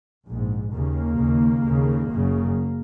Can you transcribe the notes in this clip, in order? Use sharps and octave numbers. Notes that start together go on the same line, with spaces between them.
A#1 G#2
D#2 C#3 A#3
D#2 C#3
D#2
C#3
F#1 F#2 C#3